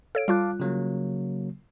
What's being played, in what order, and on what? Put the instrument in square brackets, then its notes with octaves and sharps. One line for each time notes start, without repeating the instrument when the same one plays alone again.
[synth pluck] A4 C#5 D7 [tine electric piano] F5
[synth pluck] G3 F4 F#6 [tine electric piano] F5 A5 D6
[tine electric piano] C#3 F#3 A#3